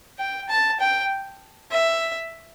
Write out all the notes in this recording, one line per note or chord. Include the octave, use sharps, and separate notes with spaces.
G5
A5
G5
E5